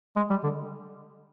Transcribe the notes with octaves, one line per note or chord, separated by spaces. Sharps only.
G#3
G3
D3